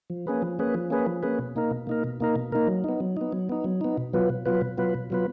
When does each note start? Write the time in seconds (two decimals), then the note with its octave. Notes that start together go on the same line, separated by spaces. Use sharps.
0.10 F3
0.27 A#3 C#4 G#4 B4
0.42 F3
0.59 A#3 C#4 G#4 B4
0.74 F3
0.90 A#3 C#4 G#4 B4
1.07 F3
1.23 A#3 C#4 G#4 B4
1.39 B2
1.56 A#3 D#4 A#4
1.71 B2
1.87 A#3 D#4 A#4
2.04 B2
2.20 A#3 D#4 A#4
2.36 B2
2.52 A#3 D#4 A#4
2.68 F#3
2.84 B3 D#4
3.00 F#3
3.17 B3 D#4
3.32 F#3
3.49 B3 D#4
3.64 F#3
3.81 B3 D#4
3.98 B2
4.13 F#3 B3 F4 B4
4.30 B2
4.46 F#3 B3 F4 B4
4.61 B2
4.78 F#3 B3 F4 B4
4.95 B2
5.10 F#3 B3 F4 B4